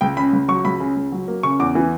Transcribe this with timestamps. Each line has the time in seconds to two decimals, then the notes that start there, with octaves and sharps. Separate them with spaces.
0.01 C#2 G5
0.17 C#3 B5
0.33 C#2
0.48 F#3 C#6
0.64 C#2 B5
0.80 C#3
0.96 C#2
1.12 F#3
1.28 A#3
1.43 C#3 C#6
1.60 E2 D6
1.75 E3